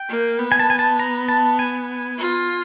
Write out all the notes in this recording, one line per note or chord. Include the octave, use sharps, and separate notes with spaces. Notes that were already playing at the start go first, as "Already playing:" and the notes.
Already playing: G5
A#3
B3
G#5
A5
G#5
A5
A#5
A5
G#5
F4